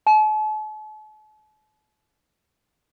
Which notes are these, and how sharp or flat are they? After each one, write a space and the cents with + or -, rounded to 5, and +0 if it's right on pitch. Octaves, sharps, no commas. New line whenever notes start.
A5 -45